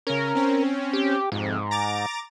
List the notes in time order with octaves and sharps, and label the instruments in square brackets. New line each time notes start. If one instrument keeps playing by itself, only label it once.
[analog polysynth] C#3 C#4 [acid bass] A#4
[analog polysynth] C4 C#4
[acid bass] G4
[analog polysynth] F2 C3 [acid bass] G#2
[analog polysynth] A#5 D6 A6